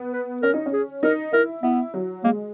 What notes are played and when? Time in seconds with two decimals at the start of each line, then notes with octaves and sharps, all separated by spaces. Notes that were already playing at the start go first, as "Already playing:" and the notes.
Already playing: B3
0.13 B4
0.42 C#4 A#4
0.54 D#4
0.66 C#4
0.73 G#4
1.03 D#4 A#4
1.33 E4 A#4
1.63 B3 E4
1.94 F#3
2.24 G#3 A#3